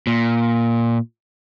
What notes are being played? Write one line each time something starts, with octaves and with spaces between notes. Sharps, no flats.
A#2